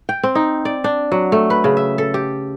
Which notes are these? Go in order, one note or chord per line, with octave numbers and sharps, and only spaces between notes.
G5
C4
D#4
D5
D4
F#3
A3
B4
C#3
E5
A4
G4